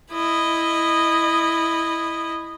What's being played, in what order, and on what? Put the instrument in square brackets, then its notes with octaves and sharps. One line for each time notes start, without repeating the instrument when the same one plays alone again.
[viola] E4 D#5